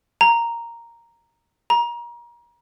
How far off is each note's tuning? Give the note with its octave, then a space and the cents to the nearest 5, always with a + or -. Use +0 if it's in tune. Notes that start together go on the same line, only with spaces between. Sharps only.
A#5 +0
A#5 +30